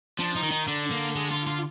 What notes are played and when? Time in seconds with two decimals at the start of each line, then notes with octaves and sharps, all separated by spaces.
0.19 F3 D4
0.36 D#4
0.43 D#3
0.51 D#4
0.67 D3 D4
0.91 A#3
1.16 G#3
1.30 F4
1.46 F4